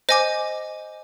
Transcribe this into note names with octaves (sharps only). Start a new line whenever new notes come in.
C5 D#5 G#5 D6